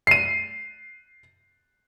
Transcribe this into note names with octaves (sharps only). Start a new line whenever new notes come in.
C7 D#7